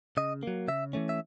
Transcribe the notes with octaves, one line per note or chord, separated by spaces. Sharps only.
C#3 D#5
F#3 A#3
C#3 E5
E3 A3 C#4
E5